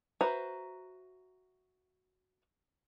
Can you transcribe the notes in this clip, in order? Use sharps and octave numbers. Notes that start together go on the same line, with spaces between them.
F#4 B4 C5 E5 A#5